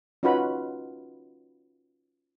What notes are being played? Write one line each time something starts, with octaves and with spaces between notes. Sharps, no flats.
C#4 D#4 F4 F#4 B4 B5